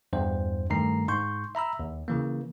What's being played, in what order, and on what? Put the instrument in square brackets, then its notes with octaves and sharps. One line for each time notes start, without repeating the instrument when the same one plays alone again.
[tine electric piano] E2 G2 C5
G2 D#3 A3 A#5 C7
G#2 C6 C#6 G6
E5 A#5 B5 E6
D#2
C#3 E3 A#3